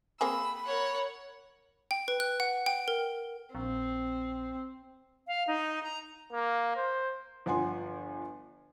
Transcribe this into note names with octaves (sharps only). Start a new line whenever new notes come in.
A#3 C4 G#4 B5 E6
A#4 C#5 F#5
G5
B4
F#6
F#5
G5
A#4
A#1 C4
F5
D#4
A#5
A#3
C5
G1 F3 F#5 G#5 C6